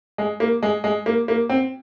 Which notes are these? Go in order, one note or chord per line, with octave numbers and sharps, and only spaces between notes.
G#3
A#3
G#3
G#3
A#3
A#3
C4